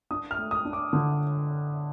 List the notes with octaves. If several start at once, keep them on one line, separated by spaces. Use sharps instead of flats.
D4 D#6
F6
A3
D#6
D4
D6
D3